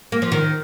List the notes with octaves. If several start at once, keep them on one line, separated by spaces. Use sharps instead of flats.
A#3
F3
D#3